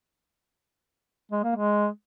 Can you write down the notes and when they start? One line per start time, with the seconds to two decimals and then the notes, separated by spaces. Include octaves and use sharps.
1.32 G#3
1.44 A#3
1.55 G#3